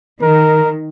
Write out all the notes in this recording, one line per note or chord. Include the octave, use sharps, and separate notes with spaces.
D#3 A#4